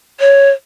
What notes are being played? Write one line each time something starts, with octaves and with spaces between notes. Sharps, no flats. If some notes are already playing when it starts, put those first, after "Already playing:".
C#5